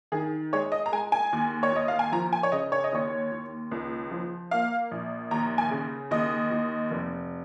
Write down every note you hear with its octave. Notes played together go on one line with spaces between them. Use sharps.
D#3 G#4
G#3 C#5
D#5
A#5
G#3 G#5
G#5
D#2
C#5
D#2 D#5
F5
G#5
F3 A#5
G#5
C#5
C#3 D#5
C#5
D#5
D#2 C#5
D#2
C#2
F3
A#3 F5
A#1
D#2 A#5
G#5
C#3
D#2 D#5
D#2
F1